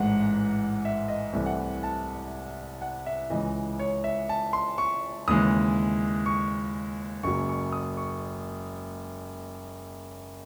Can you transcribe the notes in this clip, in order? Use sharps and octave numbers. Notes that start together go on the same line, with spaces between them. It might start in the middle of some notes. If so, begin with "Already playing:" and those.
Already playing: A1 G#2 E3 G#3 F#5
E5
D#5
C2 C3 E3 A3
F#5
A5
F#5
E5
C#2 C#3 E3 D#5
C#5
E5
A5
C6
C#6
D#2 C#3 E3 G#3 D#6
C#6
F#1 F#2 C#3 F#3 C#6
C#6
D#6
C#6